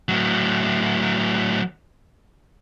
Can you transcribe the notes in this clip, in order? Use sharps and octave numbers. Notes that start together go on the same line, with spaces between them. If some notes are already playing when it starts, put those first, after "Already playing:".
A2 F#3